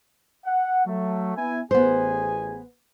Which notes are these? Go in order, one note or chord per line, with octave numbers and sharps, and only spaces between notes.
F#5
F#3 A3
B3 E4 G#5
A1 B3 G#4 C5 G#5